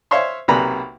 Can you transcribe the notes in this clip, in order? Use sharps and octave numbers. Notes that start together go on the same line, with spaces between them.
C5 C#5 E5 F5 C6 C#6
B1 C3 A#3 B4 A#5 B5